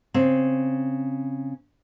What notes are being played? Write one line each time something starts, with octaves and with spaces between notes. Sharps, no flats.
C#3 C4